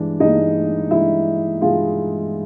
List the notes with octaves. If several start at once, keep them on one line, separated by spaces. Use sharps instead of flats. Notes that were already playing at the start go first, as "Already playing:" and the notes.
Already playing: G2 E3 G#3 D4
G2 E3 G#3 D#4 D#5
G2 E3 G#3 E4 E5
G2 E3 G#3 F4 F5